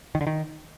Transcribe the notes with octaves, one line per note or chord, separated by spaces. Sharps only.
D#3
D3
D#3